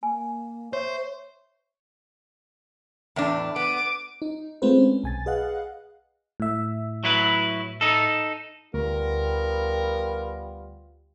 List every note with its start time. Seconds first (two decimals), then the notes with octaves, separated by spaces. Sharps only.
0.03 A#3 G#5
0.73 C5 C#5 E5
3.16 E2 A2 D4
3.56 B3 D6 D#7
4.22 D#4
4.62 G#3 A3 C4 F4 B4 C5
4.78 C#4
5.03 B1 G#5 A6
5.26 G#4 B4 D#5 F5 F#5 F#6
6.40 A2 E5
7.04 F#3 E4 B4
7.81 D#4 A4
8.74 D2 G3 B3 F4 A#4